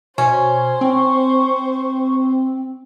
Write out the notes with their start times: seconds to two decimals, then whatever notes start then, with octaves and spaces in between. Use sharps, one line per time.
0.18 B2 C#4 C5 C#5
0.81 C4 C#6